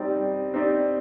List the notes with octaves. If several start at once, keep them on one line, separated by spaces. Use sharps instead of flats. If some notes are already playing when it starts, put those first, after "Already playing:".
Already playing: G3 C4 D#4 G4 D5
G3
C4 D#4 G4 D5